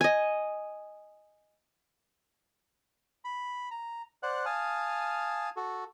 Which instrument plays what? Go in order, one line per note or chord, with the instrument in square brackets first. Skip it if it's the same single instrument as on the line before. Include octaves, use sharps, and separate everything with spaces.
[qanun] D#5 G#5
[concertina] B5
A#5
C5 D5 F#5 F#6
F5 G#5 A5 D#6 F6
F#4 A4